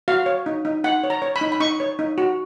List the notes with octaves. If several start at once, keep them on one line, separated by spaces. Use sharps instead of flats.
F#4 F5
C#5
D#4
D#4
D#4 F#5
C#5
A#5
C#5
B5
D#4
B5
D#4 C#6
C#5
D#4
F#4